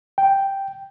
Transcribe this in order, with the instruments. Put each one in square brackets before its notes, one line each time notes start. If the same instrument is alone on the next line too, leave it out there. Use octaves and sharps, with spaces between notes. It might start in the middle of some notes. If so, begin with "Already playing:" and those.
[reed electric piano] G5